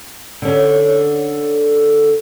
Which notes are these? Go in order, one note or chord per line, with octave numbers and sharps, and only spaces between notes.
D3 C#4